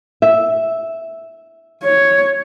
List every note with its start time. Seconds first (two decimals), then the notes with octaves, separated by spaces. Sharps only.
0.22 E5
1.83 C#5